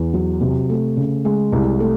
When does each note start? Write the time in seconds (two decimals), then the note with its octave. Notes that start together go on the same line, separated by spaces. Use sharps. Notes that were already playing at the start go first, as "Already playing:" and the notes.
Already playing: E2
0.14 F#3
0.41 C3
0.69 A3
0.97 C#3
1.25 G#3
1.52 C2
1.80 A3